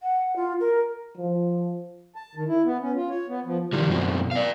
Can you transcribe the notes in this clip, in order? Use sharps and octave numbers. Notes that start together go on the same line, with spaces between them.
F#5
F4
A#4
F3
A5
D#3
E4
B3
C#4
F4
C#5
B3
F3
D#3 F3 G3
F#2 B2 C4
D5 F5